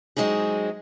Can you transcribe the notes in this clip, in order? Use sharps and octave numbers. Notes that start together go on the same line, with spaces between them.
F#3 G#3 C4 D#4 G#4